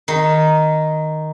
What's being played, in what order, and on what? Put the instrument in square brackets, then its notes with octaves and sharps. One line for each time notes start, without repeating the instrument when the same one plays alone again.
[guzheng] D#3